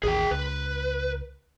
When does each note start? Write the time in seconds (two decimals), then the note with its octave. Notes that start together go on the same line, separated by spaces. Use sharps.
0.03 A1 D#2 G#4 G5
0.31 C#2 B4